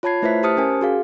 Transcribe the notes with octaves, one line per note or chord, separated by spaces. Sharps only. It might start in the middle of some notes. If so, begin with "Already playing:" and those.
F4 C#5 A5 B5 G#6 C7
A3 E4 B4 C5 E5 B6
G4 C5 A5 D#6 F6 C#7
C#4 A#4 G#5
F#4 G#4 F5